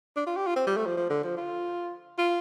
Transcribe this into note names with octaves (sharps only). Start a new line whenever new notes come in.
D4
F4
G4
F4
C4
G3
A3
F3
F3
D3
F3
F4
F4